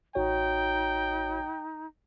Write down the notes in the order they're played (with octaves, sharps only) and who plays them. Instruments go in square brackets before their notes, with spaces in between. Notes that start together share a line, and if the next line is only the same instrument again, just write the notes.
[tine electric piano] A1 F#4 C#5 [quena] D#4 [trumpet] G5